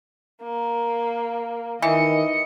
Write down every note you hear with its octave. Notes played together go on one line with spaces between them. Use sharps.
A#3
D#3 E3 D#5 C#7